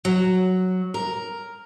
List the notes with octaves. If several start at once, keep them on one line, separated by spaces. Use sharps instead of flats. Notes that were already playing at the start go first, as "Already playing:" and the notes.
F#3
A#4